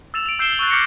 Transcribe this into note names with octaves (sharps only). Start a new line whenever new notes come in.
E6 A6 E7 F7
D7 F7
E6 G6 C7 D7 E7 G7
C#6 E6 F#6 A6
D6 F6 G6 A#6 C7 C#7